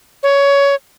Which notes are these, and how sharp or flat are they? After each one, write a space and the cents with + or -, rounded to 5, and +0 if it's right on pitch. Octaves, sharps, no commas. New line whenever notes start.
C#5 +15